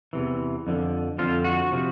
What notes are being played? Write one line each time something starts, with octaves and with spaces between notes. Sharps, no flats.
E2 C3 E3
F2 D3 F3
F2 D3 F3 F4
F#4
C3 F3